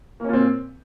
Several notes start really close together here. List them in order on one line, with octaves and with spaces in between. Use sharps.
A#3 C#4 A#2 C4